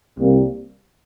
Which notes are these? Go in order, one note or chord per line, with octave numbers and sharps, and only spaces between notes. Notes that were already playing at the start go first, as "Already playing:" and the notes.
C2 C3 G3 A#3